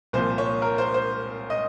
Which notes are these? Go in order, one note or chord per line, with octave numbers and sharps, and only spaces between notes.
C2 A#2 F3 C5
C#5
A#4
C5
C5
D#5